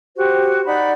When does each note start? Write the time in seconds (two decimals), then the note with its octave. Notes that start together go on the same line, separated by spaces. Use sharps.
0.17 F#4 G4 C5
0.65 D#4 D5 F#5 B5